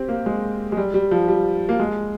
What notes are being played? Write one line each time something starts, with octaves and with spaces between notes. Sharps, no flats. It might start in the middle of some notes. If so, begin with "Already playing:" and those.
Already playing: C4 G4
A#3
G#3
G#3
G3
G3
F3
G3
A#3
G#3